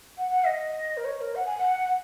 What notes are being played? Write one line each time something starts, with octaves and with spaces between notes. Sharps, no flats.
F#5
F#5
D#5
A#4
C#5
A#4
F#5
G#5
F#5